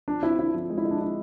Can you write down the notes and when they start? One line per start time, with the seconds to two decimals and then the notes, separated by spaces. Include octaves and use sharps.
0.08 F3 D4
0.23 C4 E4
0.38 D3 E4
0.55 F3
0.70 G#3
0.78 E4
0.85 G#3
0.91 D4
1.01 E4